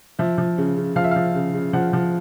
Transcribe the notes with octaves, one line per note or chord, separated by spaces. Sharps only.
F3 E5
F3
C#3
C#3
F3 F5
E5
F3 F5
C#3
C#3
F3 F#5
F3